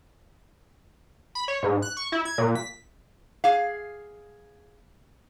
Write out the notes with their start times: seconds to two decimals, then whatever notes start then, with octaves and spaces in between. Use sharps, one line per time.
1.35 B5
1.48 C#5
1.63 G#2
1.82 F#6
1.97 C#6
2.12 E4
2.25 G#6
2.38 A#2
2.55 B6
3.44 G#4 F5